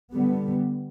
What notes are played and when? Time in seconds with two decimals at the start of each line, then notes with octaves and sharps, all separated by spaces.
0.14 D3 G3 B3